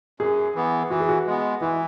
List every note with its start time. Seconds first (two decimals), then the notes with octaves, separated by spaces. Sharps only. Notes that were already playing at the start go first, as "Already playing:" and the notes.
0.20 F#2 G#4
0.54 E3 B3
0.90 E3 F#4
1.00 G#4
1.09 F#4
1.27 G#3 B3
1.61 E3 E4